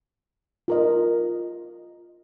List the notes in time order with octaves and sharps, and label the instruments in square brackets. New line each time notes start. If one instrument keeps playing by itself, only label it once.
[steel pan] F4 A#4 D#5